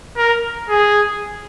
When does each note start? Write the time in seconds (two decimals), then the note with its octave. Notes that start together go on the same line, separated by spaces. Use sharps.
0.17 A#4
0.69 G#4